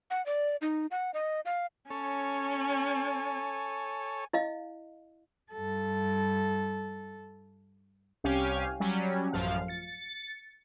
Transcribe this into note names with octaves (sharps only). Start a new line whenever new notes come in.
F#5
D5
D#4
F#5
D#5
F5
C#4 A4 C#5 G#5
E4 D#5 F5
G2 A4
C2 C#4 G4 F5 G#5
F#3 G3 C#4
A1 F#2 F3 F5
A6 C#7